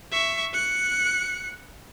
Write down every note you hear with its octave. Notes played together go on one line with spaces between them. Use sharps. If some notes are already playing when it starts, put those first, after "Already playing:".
E5 C#6
F#6 C#7